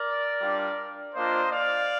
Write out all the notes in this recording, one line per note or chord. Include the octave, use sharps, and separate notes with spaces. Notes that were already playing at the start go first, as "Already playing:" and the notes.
Already playing: A#4 D5
G3 D4 F4
A#3 D4 F4 C5 D#5
D5 F5